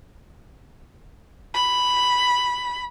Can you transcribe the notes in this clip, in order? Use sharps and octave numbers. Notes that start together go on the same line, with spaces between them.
B5